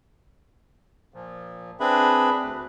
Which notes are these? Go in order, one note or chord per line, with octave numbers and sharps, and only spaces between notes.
A#2 F3
C4 D4 G#4 B4 E5 B5
D2